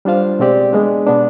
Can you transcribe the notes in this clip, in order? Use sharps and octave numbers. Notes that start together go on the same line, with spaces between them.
G3 D4 F4 C5 F5
B2 G#3 C4 G4 D5
G#3 B3 D4
B2 B3 D4